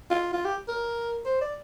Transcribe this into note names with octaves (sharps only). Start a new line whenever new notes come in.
F4
F4
G4
A#4
C5
D5